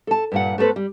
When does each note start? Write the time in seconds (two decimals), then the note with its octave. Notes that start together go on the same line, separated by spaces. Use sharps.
0.07 A4 A5
0.32 G2 A#2 F#5
0.58 A3 B3 A4 B4 C5
0.76 G3